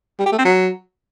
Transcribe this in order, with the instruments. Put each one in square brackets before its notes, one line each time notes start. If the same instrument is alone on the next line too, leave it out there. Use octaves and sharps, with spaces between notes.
[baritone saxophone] G3
G4
A3
C4
F#3